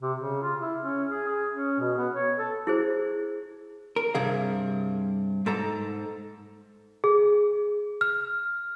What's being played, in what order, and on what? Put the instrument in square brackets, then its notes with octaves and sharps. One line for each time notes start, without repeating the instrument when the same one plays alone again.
[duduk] C3
C#3
F4
E4
C#4
G#4
G#4
C#4
B2
B3
C#5
A4
[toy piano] E4 G#4 C5
[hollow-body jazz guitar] A#4
G2 C3 G#4 F5
G#2 A4 A#5
[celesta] G#4
F6